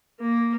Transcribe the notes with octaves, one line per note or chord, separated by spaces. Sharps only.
A#3